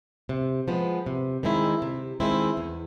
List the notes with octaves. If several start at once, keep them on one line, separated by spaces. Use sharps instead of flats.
C3
F3 G#3 B3
C3
D#3 G#3 C4 E4
C3
D#3 G#3 C4 E4
E2